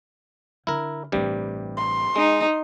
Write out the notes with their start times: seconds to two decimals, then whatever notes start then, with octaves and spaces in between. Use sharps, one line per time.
0.67 D3 E4 A#4
1.12 A1 G2 C3 E3 G3
1.77 C6
2.16 G#3 D#4